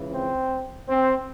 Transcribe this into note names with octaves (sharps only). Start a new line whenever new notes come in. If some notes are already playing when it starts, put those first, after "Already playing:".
Already playing: C#2 C#3 E3
C4
C4